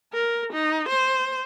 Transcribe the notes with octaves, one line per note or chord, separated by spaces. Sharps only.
A#4
D#4
C5